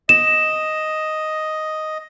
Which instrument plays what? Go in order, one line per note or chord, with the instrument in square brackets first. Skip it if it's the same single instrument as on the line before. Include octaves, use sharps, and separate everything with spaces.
[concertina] D#5 [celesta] E7